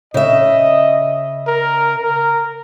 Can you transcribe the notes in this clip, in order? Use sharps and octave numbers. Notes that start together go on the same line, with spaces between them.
C#3 D#5 E5
A#4
A#4